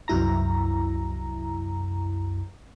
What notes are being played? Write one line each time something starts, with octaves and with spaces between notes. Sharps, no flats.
C2 F#2 E4 A#5